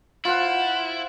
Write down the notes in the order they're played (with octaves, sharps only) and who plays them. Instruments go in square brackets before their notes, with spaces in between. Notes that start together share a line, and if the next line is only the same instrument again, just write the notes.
[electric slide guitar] E4 [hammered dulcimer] F4 C5 F#5